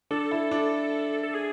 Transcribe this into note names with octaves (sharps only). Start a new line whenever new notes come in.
D4 A4
E4
D4
A4
G#4